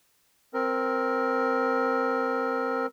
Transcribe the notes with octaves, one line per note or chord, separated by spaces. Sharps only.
C4 A#4